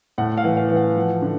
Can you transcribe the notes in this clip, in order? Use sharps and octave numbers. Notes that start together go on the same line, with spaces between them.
A2 F#5
F5
E3
F5
E3
F#5
F3
D3